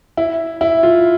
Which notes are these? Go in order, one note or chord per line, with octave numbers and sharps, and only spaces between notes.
E4
E4
F4